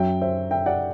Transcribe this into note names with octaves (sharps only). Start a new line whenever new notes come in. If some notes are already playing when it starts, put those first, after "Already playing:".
Already playing: F#2 F#3 E5 G5
C5 E5
E5 G5
D5 F#5